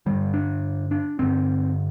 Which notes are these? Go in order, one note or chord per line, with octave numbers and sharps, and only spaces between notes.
G2 D3 G3
D4
D4
G2 D3 C4